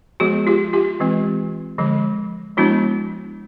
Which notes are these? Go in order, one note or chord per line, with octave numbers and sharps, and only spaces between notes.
F3 G#3 B3 F#4 G#4
F4 G4
F4 G4
E3 G#3 C4
D3 F3 G#3
F3 G#3 B3 D4 E4 F#4